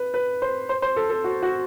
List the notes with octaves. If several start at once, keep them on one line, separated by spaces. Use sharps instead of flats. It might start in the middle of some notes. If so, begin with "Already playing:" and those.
Already playing: B4
B4
C5
C5
C5
A4
A4
F#4
F#4